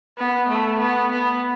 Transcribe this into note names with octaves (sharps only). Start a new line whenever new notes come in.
B3
A3
B3
B3